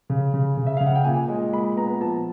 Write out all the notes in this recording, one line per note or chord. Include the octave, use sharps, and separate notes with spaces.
C#3
C#3
C#3
E5
C#3 F5
F#5
G5
A#2 G#5
G#3
A#2 B5
B3 A#5
F3 A5